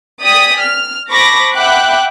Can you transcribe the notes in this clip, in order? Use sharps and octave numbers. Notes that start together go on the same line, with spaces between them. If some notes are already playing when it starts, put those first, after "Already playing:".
D5 G5 G#5 D#6 B6
F6
C5 A5 B5 C#6 D6 A#6
E5 F#5 G5 B5 D6 F#6